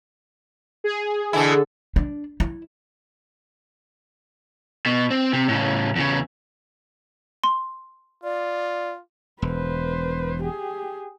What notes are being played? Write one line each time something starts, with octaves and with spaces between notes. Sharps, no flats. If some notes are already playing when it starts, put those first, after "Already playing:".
G#4
B2 D3 E3 E4 A4
D4
E4
B2
C4
C3
A2 C#3
E2 C#3
C6
F4 D5
E1 B4 C5
G4 G#4